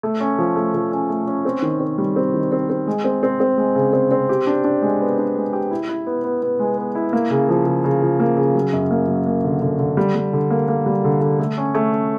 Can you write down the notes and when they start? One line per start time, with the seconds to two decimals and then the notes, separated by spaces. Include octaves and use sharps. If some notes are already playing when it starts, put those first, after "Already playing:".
0.03 A3
0.20 C#4
0.38 F3
0.56 A3
0.74 F3
0.92 C#4
1.09 A3
1.27 C#4
1.45 C4
1.62 D#3
1.80 C4
1.98 G3
2.16 C4
2.34 D#3
2.52 C4
2.70 C4
2.87 G#3
3.04 C4
3.23 C4
3.40 C4
3.58 G#3
3.75 C#3
3.93 C4
4.11 C4
4.29 G4
4.47 D4
4.64 D4
4.82 G#3
5.00 B3
5.18 D4
5.36 G#3
5.53 G4
5.71 E4
5.89 E4
6.07 B3
6.24 B3
6.42 B3
6.59 G#3
6.78 B3
6.95 E4
7.13 A#3
7.30 C#3
7.49 F3
7.66 C#3
7.84 C#3
8.02 F3
8.20 A#3
8.37 C#3
8.55 F#3
8.73 F#2
8.91 A#3
9.08 F#3
9.26 A#3
9.44 D3
9.61 D3
9.79 D3
9.97 G3
10.15 G3
10.33 D3
10.50 A#3
10.68 A#3
10.86 G3
11.04 D3
11.21 D3
11.39 A3
11.58 C#4
11.75 A3
11.93 C#4